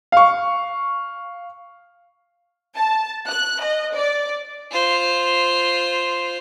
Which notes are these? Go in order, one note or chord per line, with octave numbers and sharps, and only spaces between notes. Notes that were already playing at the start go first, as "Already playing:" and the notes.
F5 C#6
A5
F#6
D#5
D5
F4 C5